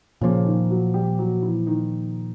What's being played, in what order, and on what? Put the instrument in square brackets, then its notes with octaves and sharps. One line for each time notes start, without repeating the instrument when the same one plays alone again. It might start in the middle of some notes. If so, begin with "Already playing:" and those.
[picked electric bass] A#2 F3 A#3 [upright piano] C#3 C#4
[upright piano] D#3 D#4
F#3 F#4
G3 G4
F#3 F#4
E3 E4
D#3 D#4